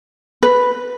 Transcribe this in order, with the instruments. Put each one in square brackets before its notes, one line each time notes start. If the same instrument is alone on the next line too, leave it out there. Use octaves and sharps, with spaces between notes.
[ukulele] B4